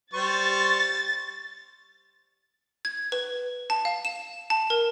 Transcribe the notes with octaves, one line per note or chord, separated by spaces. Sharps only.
G3 C5 C#6 A6
G#6
B4
A5
F5
E7
A5
A#4